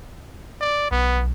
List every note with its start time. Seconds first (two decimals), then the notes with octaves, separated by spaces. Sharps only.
0.61 D5
0.91 B1 B3